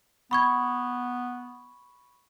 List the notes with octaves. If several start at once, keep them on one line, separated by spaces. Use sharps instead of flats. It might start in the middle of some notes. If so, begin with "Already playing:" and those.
B3 B5 C#6 G#6